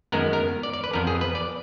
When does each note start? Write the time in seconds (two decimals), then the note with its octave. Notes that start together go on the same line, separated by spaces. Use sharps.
0.12 F#2 D#3 G#3 B3 A#4
0.33 A#4
0.63 D5
0.73 D5
0.84 B4
0.93 F2 F3 B3 A#4
1.07 G#4
1.21 B4
1.35 D5